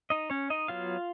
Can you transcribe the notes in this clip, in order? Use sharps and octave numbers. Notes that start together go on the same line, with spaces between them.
D#4 D#5
C#4 C#5
D#4 D#5
F#3 B3 F4 F5